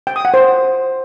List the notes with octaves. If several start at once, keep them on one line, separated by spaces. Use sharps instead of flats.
G5
D#6
F#5
C5